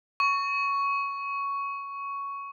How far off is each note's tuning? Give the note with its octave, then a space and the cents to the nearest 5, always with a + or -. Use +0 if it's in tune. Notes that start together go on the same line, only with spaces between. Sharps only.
C#6 +10